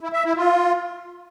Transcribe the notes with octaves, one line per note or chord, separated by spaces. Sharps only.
E4
E5
E4
F4